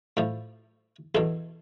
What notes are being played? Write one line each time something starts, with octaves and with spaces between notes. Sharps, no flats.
A2 F3
E2 B2 A4